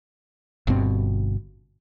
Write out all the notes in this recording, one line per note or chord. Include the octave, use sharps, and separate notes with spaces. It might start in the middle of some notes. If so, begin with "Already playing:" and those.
G1 G2 B2 C4